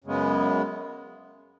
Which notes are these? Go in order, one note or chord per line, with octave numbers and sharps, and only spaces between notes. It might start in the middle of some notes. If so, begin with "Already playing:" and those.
F#2 C#3 G#3 B3